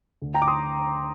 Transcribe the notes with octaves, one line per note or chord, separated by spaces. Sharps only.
D2 D3
G5 A#5
D6
C6 D#6